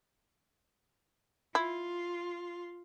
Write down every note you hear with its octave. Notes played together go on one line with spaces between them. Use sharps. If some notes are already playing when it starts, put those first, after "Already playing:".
E4 F4